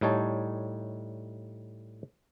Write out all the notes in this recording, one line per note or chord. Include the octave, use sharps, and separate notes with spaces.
A2 G3 D#4 C#5 A5